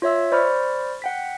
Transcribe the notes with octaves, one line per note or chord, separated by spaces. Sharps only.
F4 C#5 E5 E6
C5 D5 B5 C#6 F6
F#5 G5 B6